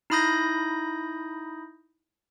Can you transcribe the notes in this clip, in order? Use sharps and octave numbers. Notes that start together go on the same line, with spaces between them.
D#4 E4 B5 D#6 G6 A#6